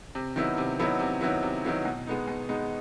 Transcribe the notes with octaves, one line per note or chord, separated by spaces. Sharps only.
C3
D#3 F#3 B3 E4
C3
D#3 F#3 B3 E4
C3
D#3 F#3 B3 E4
C3
D#3 F#3 B3 E4
B2
G#3 B3 D#4
B2
G#3 B3 D#4